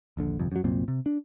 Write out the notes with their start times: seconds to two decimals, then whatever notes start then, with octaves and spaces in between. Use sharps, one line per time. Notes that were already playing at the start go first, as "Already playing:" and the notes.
0.17 D#1 A#1 D3
0.39 G1 C2 F2
0.52 F#2 F#3
0.64 C2 F#2 A#2 C4
0.88 C3
1.06 D4